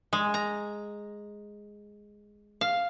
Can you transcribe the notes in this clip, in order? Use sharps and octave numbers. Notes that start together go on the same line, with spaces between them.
G#3
A#5
F5